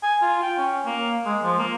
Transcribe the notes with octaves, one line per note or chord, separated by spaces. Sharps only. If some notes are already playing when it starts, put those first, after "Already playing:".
G#5
F4
G5
C#4
A#3
G#3
F3
A#3